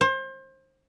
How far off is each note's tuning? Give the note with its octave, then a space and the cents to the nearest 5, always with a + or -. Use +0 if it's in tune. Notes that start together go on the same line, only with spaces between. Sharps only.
C5 +30